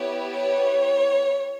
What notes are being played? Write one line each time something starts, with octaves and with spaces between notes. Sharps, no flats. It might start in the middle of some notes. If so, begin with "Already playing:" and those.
Already playing: B3 E4 G4 C#5
C#5